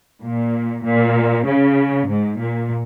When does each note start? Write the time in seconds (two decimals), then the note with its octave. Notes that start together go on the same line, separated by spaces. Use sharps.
0.22 A#2
0.84 A#2
1.45 C#3
2.07 G#2
2.38 A#2